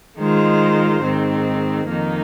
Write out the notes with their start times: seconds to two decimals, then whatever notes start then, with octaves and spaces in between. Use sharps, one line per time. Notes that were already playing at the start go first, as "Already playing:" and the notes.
0.18 D#3 G#3 F4 C5
1.03 G#2 D#3 C4
1.88 F2 D#3 A#3 D#4